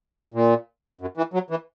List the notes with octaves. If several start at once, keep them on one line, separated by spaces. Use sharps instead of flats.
A#2
F#2
E3
F#3
E3